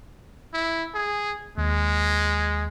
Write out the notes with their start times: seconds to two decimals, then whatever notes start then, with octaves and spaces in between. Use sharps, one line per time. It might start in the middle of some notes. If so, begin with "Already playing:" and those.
0.54 E4
0.95 G#4
1.58 D#2 G#3